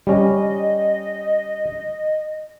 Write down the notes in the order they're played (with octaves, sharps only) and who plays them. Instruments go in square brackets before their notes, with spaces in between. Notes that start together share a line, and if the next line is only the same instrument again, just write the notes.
[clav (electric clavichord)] G3 C#4 [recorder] D#5